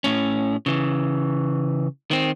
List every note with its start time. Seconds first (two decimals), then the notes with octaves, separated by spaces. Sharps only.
0.04 A2 C#4
0.66 C#3 E3
2.11 D#3 C4